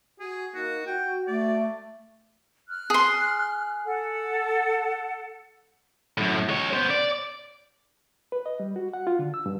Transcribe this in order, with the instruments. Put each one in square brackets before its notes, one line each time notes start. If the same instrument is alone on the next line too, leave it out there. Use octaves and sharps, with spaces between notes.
[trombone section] F#4 [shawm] G#4
[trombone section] A#3 D#4 [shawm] F#4
[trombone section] F#4 [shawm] G5
[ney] A3 [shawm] D5
[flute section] F6 F#6
[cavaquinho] G#4 C6
[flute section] A4 F#5
[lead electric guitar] F#2 A2
G#3 C#5
B3 C5
D5
[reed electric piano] B4
D#5
G3
F#4
F#5
F4
D3
E6
G2